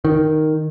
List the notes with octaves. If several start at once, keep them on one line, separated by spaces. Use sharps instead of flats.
D#3